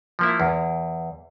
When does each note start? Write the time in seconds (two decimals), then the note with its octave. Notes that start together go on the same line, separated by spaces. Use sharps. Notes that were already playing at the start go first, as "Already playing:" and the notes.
0.19 F3 A#3 E4
0.40 E2